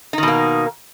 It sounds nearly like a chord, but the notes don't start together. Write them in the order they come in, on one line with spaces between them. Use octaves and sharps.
D#4 D#3 B2 A#3